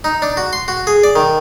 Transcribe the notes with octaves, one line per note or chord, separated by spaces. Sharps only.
D#4
D4
F#4
C6
F#4
G#4
D5
D#3